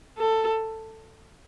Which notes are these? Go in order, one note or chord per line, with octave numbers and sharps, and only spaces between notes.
A4